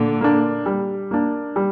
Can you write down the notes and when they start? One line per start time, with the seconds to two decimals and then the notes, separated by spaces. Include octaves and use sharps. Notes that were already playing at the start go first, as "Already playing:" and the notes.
Already playing: A#2 D3
0.21 A#3 D4
0.66 G3
1.11 A#3 D4
1.56 G3